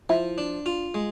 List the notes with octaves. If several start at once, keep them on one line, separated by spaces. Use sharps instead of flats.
F3 E4
D4
F4
G#3